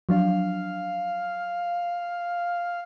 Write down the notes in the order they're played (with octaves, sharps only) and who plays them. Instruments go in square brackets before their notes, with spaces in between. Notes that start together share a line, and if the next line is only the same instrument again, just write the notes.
[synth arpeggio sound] F3 F#3 D4 [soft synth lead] F5